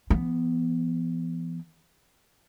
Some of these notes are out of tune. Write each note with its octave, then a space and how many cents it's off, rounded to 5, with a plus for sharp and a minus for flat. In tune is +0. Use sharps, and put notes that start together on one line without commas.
E3 +45 B3 +5